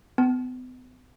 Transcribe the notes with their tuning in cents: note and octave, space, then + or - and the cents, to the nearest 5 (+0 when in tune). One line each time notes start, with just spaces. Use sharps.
B3 +40 A5 -35